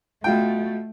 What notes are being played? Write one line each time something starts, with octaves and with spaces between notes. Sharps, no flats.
B2 A3 F4 G5